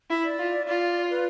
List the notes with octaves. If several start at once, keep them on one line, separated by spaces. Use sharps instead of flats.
E4
D5
F4
F4 D5
B4